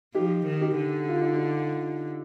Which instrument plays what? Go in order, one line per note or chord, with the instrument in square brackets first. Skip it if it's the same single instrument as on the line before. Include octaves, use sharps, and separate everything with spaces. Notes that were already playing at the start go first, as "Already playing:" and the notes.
[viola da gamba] F3 [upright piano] D#4 G4
[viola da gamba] D#3
[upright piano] D#4 G4
[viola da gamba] D3
[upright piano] F4
D#4
D4 F4